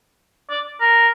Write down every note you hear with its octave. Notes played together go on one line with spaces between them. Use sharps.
D5
A#4